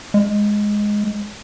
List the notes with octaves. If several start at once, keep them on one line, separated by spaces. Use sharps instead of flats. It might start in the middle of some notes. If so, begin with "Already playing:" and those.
G#3